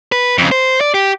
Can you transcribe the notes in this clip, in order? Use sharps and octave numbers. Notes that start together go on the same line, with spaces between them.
B4
F2 C#3
C5
D5
G4